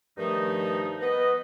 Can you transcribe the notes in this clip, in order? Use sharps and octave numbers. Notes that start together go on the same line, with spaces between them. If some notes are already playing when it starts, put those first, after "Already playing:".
G2 D#3 F3 A3 D#4
B3 B4 D#5